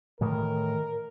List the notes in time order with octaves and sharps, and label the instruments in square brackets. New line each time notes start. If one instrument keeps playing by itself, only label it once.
[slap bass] A2 D#3 E3 [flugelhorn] A#4